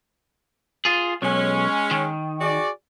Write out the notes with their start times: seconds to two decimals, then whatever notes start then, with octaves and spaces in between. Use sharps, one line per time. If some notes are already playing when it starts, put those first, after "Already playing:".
0.85 F4 G#4
1.22 B1 G#3 C#4
1.91 D#3
2.41 F#4 G#4 D5